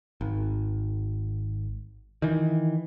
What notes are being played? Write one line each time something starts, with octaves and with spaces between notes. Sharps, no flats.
G#1
D#3 E3